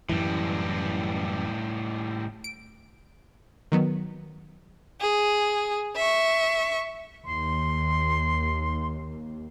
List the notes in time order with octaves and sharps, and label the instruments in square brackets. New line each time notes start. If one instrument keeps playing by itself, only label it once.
[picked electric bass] F#2 E3 [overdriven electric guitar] A2 G3
[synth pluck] D7
D#3 F#3 B3
[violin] G#4
E5 C#6
[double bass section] D#2 [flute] C6